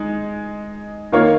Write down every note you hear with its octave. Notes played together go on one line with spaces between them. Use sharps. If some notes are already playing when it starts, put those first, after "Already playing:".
Already playing: G#3 D#4
D#3 A#3 F4 C#5